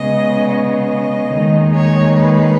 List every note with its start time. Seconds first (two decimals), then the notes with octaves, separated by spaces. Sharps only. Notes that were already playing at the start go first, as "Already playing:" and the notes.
Already playing: C#3 G#3 B3 D#5
0.49 D#5
1.32 D#2 D#3 G#3 D#4
1.75 C#5
2.16 B4